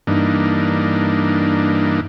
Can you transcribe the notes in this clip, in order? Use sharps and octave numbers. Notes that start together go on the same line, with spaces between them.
G2 E3 A#3 D4 D#4